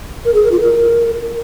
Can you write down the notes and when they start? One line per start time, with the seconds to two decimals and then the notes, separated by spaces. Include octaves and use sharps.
0.25 A#4
0.33 G#4
0.42 A#4
0.51 F4
0.60 A#4